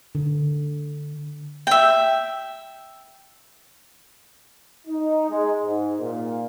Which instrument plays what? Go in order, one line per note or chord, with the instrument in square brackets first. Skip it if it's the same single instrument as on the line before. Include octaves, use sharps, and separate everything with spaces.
[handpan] D3
[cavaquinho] E5 G5
[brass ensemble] D#4
G#3
G#2
A#2